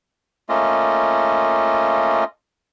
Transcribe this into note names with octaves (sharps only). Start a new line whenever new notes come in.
A3 A#3 C#4 F4 D#5